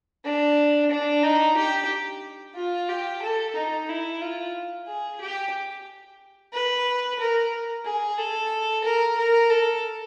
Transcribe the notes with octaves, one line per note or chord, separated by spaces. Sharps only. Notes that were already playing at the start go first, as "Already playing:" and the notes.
D4
D4
D#4
G4
F4
G4
A4
D#4
E4
F4
G#4
G4
B4
A#4
G#4
A4
A#4
A#4
A4